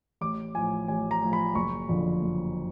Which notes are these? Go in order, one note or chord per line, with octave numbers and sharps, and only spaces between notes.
A1 D6
A2 F3 G#5
A1 G#5
A#5
A2 F3
B5
F#1 C#6
F2 D3 F3
F#1